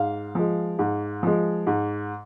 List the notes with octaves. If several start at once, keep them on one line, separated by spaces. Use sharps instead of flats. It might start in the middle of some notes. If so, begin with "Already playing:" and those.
Already playing: G#2 F5
F3 G#3
G#2
F3 G#3
G#2